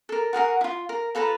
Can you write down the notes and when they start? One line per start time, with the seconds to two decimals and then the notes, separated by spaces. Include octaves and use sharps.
0.09 A4 A#4
0.33 F#4 G#4 A#4 F#5
0.61 E4 F4
0.89 A#4
1.15 F4 A4 B4 A#5